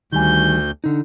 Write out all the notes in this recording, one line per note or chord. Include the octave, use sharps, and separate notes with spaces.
D2 D#3 G3 G#5 G6
D3 D#4